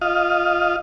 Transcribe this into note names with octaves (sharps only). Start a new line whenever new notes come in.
F4 D#5 F5